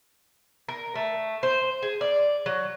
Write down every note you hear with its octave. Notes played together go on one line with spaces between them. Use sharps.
A#4
A3
C5
G#4
D5
F#3